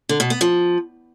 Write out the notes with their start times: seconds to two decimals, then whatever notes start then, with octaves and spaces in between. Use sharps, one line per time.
0.09 D3
0.20 B2
0.30 B3
0.41 F3